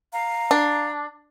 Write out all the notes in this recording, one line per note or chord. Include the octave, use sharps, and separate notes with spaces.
F5 A#5
D4